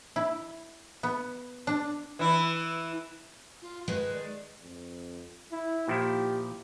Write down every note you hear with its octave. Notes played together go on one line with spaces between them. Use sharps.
E4
B3
D4
E3 E4
F4
D#3 G#3 B4
D5
F2
E4
A#2 F3 E4 G4